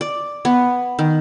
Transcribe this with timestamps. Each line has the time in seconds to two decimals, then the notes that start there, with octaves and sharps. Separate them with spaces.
0.01 D5
0.45 B3
0.99 D#3